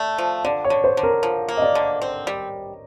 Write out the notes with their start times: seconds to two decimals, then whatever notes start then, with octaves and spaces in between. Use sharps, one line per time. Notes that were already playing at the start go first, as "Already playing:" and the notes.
Already playing: A3 D5
0.18 F3
0.44 D3 D5
0.64 C#5
0.70 D3
0.84 C5
0.97 D3
1.03 A#4
1.23 F3
1.49 A#3
1.57 D#5
1.62 D5
1.75 D3
2.02 C4
2.27 G3